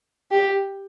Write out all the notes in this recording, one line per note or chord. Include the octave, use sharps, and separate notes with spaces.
G4